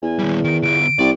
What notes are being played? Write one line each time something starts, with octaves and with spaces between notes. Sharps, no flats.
E2 G#5
D#3 G3
D#3 D7
D3 B3 D7
C2 D5